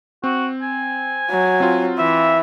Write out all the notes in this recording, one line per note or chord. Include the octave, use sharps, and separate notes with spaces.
C4 F#4
G#5
F#3
C4 F4
E3 E5